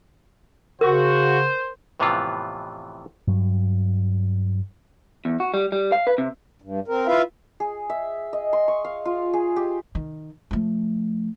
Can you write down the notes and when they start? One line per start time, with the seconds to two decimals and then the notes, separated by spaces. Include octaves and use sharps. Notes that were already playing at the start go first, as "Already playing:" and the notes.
0.81 C#3 F#4 A#4 C5
2.00 F2 A2 C3 E3 B3 F4
3.28 G2 F#3
5.25 E2
5.40 F#4
5.54 G3
5.72 G3
5.92 F5
6.07 B4
6.18 C3
6.62 G2
6.88 C4 A#4
7.07 E4 F4 B4 E5 F5
7.60 G#4
7.90 E5
8.33 D#5
8.53 C6
8.68 C#6
8.85 F5
9.05 F4
9.33 G#4
9.56 G4
9.95 D#3
10.51 F3 A3